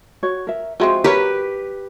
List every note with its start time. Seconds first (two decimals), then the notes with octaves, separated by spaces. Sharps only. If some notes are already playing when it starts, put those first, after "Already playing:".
0.23 F#4 C#5
0.47 A#4 E5
0.80 F3 G#3 C4 F#4 E5
1.04 G3 G4 A#4 B4 C#5